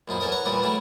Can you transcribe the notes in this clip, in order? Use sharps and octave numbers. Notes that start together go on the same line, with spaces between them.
A#1 F#2 D#4 E4
E2 C#4 A4 A#4 D#6
C#5 F#5 A#5
A#2 E3 G3 G4 D#6
F#3 G3 A3 E4